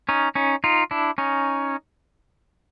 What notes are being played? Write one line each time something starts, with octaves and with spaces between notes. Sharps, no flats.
C#4 D#4
C#4 D#4
D#4 F4
D4 E4
C#4 D#4